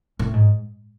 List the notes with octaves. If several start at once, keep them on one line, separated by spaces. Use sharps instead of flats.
A2
G#2